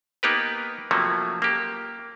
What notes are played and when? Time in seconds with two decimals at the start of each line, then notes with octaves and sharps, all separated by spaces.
0.23 A#3 B3 D#4 G4 A#4 B4
0.91 C3 F3 F#3 A3 A#3 C#4
1.42 A#3 G4